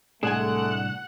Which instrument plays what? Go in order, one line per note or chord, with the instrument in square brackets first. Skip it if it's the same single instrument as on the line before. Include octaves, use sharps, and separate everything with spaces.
[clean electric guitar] C2 A2 D4 [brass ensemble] G#3 A3 [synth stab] G#4 G#5 [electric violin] F#5